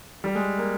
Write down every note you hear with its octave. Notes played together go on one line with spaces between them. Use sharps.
G3
G#3
A#3